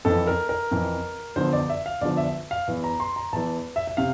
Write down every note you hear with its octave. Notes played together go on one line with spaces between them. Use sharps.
F2 E3 A4
A#4
A#4
F2 E3
E2 D3 F3 C5
D5
E5
F5
E2 D3 F3 D5
E5
F5
E2 E3
A#5
C6
A#5
E2 E3 A5
E5
E5
C3 F5